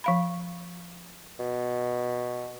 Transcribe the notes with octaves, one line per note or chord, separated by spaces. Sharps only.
F3 F5 B5
B2